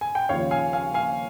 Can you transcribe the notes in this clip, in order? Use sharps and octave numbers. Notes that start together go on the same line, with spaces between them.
G#5
G5
D#2 C#3 F3 C#5 F5
F5 G#5
F5 G#5
F5 G#5